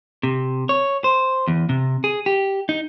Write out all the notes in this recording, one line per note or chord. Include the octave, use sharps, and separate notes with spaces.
C3
C#5
C5
E2
C3
G#4
G4
D#4